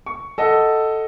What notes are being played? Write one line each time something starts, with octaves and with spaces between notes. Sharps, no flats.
C#6
A4 D#5 F#5